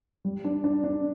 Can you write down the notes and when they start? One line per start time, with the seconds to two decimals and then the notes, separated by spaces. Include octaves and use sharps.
0.25 G3
0.44 D4
0.64 D4
0.84 D4